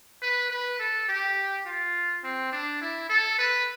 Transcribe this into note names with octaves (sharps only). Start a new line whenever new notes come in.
B4
B4
A4
G4
F4
C4
D4
E4
A4
B4